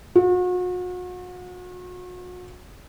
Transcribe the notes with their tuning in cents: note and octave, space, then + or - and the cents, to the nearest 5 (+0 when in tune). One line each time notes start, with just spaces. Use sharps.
F#4 -40